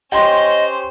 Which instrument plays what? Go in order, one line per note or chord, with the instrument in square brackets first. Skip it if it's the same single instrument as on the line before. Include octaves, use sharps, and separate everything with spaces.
[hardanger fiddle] C#4 C5 [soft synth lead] G4 [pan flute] D#5 [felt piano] G5 C6